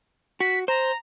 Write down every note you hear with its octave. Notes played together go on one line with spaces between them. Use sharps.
F#4 B6
C5 A#5